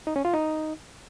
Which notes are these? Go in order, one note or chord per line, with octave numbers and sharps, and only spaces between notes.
D#4
C#4
F4
D#4